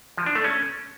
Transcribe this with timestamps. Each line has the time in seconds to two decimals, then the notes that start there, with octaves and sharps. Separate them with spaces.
0.17 F3
0.26 D4
0.35 A3
0.44 C#4